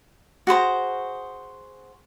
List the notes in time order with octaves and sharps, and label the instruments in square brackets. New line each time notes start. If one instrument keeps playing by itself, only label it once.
[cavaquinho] F#4 G#4 C5 A#5